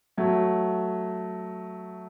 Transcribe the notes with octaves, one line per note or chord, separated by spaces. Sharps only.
F#3 A3